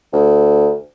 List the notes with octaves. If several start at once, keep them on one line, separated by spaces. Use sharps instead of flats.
D2